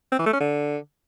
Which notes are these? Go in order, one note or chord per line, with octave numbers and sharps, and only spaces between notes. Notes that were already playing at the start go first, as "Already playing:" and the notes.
C4
E3
A3
C#4
D3